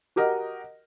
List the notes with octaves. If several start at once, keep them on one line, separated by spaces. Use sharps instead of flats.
F#4 G4 A#4 D#5 F#5